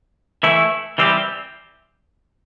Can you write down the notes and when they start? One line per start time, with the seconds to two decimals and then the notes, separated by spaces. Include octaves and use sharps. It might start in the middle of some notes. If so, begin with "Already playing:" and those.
0.43 E3 A3 E4
0.98 E3 G3 C4 G4